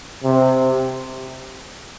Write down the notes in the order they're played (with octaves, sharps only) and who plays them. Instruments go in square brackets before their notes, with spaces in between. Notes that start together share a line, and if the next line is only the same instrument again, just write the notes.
[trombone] C3